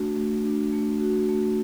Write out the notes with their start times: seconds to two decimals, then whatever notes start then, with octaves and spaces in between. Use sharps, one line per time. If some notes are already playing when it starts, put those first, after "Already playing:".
Already playing: A3 D4 F#4
0.17 A3
0.44 D4
0.72 A3
1.00 F#4
1.29 A3